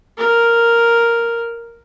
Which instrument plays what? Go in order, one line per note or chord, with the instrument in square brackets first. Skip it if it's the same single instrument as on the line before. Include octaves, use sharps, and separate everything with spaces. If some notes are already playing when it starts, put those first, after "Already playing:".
[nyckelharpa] A#4